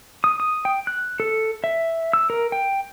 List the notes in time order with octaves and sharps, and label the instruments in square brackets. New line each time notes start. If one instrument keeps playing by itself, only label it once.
[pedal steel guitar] D#6
D#6
G5
F#6
A4
E5
E6
A#4
G5